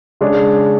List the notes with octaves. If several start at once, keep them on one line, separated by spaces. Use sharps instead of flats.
C#3 G#3 D4 G#4 C#5